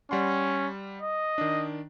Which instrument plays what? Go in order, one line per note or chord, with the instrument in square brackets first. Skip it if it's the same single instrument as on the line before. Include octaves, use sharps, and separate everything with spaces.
[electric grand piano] G3 F#5 C6 [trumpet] C#4
[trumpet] D#5
[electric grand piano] D#3 D4